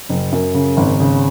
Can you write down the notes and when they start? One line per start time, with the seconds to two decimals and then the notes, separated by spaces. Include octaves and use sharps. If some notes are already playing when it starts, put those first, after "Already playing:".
0.09 F#1
0.32 F#2
0.54 C#3
0.77 G#1
1.00 C#3